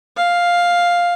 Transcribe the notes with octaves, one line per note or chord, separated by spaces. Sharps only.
F5